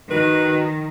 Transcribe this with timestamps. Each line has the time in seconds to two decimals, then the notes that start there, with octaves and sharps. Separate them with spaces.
0.11 D#3 F#4 B4